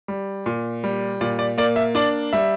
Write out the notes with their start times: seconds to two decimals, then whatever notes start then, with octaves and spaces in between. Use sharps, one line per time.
0.08 G3
0.46 A#2
0.84 G3
1.21 A#2 D5
1.39 D5
1.58 A#3 D5
1.76 E5
1.95 D4 D5
2.33 G3 E5